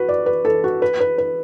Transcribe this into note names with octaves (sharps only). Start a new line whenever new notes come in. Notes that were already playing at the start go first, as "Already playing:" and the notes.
Already playing: F#4 B4
D5
B4
A4
F#4
B4
B4
B4